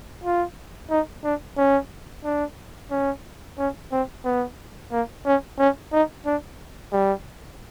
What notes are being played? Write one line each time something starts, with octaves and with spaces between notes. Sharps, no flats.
F4
D#4
D4
C#4
D4
C#4
C#4
C4
B3
A#3
C#4
C#4
D#4
D4
G3